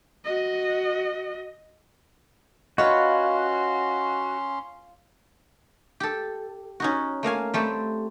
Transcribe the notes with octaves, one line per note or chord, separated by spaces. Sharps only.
F#4 D#5
C#4 F4 F#4 B4 C#5 D#5 C6
G4 A4
C#4 D#4 F#4
A3 A#3 F5 G#5
G3 A3 C4 G4